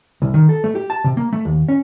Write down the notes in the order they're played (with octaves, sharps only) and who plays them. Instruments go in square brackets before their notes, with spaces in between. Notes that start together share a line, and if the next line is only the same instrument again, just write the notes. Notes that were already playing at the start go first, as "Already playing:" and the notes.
[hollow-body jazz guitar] C2
D#3
A4
A3
G4
A5
C3
A#3
A3
D#2
C#4